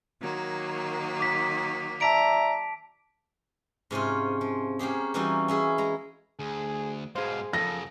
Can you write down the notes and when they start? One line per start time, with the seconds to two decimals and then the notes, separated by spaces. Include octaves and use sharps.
0.20 D#3 F#3 A#3
1.20 D6 B6
2.01 D5 E5 A5 A#5 B6 D7
3.91 G#2 C3 C#4 F4
4.41 F3
4.79 A#3 C#4 G4 G#4
5.14 E3 G3 A#3 C#4 D#4 F#4
5.48 C#4 E4 G#4
5.78 G#3 A#5
6.39 D2 G#4
7.15 G#2 B2 G#4 C5 F5
7.53 F#2 C#3 F3 A4 A#6